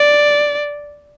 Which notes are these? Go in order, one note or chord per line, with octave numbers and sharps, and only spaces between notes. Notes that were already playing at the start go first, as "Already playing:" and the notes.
Already playing: D5